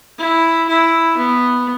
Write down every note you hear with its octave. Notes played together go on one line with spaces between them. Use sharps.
E4
E4
B3